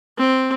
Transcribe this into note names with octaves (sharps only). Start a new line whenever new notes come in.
C4